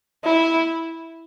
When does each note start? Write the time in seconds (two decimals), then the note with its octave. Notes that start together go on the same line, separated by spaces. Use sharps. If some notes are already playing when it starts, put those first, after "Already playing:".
0.24 E4